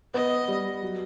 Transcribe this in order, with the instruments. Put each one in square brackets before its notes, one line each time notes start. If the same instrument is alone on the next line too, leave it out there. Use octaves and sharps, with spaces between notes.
[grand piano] B3 [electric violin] D#5
[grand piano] G3
F#3